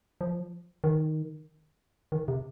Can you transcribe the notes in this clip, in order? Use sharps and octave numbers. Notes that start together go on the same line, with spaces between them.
F3
D#3
D#3
C3